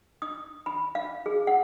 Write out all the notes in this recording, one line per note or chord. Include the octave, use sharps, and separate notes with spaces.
D#6
B5
F5
G#4
F#5